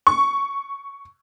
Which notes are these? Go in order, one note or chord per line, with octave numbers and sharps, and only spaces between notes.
C#6